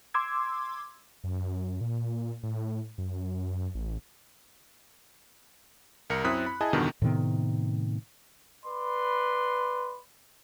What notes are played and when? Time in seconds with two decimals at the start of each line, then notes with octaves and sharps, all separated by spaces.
0.14 C6 D6 E6 G#6
1.24 F#2
1.81 A#2
2.43 A2
2.98 F#2
3.75 A1
6.10 C2 A#4 C#7
6.24 F#2 C4 E4 D#6 F#6 B6
6.47 B5
6.61 E4 G#4 D#5 G#5 A5
6.73 E2 G2 B2 D3 D#3
7.02 A2 C3 D#3 B3
8.65 B4 D5 B5 C6